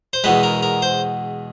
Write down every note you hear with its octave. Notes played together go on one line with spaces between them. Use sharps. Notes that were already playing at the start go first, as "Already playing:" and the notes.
C5
E2 B2 G#3 B4
A#4
A#4
C5